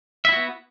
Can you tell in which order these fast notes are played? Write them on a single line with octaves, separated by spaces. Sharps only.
E5 E4 F#4 B3